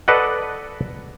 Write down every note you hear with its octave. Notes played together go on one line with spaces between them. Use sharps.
A4 B4 D5 D#5 F#5